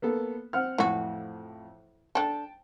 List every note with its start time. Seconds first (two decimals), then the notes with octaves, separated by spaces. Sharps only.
0.02 A#3 B3 A4
0.53 C4 F#5 F6
0.78 F2 A2 E3 F#4
2.15 D4 A4 G5 A5